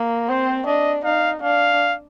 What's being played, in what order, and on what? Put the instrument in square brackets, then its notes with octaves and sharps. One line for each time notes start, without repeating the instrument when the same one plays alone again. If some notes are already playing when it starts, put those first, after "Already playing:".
Already playing: [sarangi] A#3
[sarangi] C4 [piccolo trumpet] C5
[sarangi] D4 [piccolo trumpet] D#5
[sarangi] D#4 [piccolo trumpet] F5
[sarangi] D4 [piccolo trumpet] F5